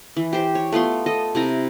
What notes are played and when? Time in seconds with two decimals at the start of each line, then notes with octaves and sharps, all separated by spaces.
0.16 E3
0.33 G4 C5
0.55 C#5
0.72 A3 B3 F4 C6
1.06 A4 D#5
1.35 C3 E4 A#5